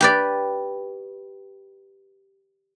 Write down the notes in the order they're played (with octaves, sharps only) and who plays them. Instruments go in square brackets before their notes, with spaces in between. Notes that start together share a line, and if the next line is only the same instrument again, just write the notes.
[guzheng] G4 B4 D5